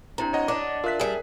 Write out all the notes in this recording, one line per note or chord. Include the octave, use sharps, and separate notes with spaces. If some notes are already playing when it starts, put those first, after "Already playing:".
C3 D4 E4 A#5
C#5 D#5 F#5
D4 D6
F4 A#4 E5 F#6 B6
G3 G#4 E5